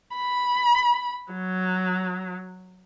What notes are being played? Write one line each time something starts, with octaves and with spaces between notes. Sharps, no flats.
B5
F#3